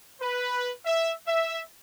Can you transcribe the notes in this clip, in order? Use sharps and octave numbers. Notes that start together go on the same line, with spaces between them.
B4
E5
E5